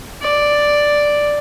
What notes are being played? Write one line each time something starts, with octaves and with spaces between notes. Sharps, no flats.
D5